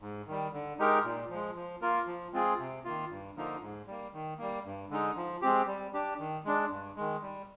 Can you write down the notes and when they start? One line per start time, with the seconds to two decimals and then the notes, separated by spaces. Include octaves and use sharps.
0.01 G#2
0.27 D#3 G3
0.53 D3
0.79 G#3 D#4 G4 A#4
1.04 A#2
1.30 F3 G#3
1.55 F3
1.82 A#3 F4 A#4
2.07 F3
2.33 G#3 C4 F4 G#4
2.59 C3
2.85 D#3 A#3 F4
3.10 G2
3.36 D3 F3 A#3 D#4
3.62 G#2
3.87 G3 A#3
4.13 D#3
4.38 G3 A#3
4.65 G2
4.90 D3 G#3 D#4
5.16 F3
5.42 G#3 C4 G4
5.67 G3
5.93 D4 G4
6.19 D#3
6.45 G#3 D4
6.70 G2
6.96 D#3 G#3
7.22 G3